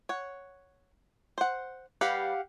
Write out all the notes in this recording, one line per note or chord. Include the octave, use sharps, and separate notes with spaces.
C#5 F#5
C5 F#5
G3 G4 B4 F5 F#5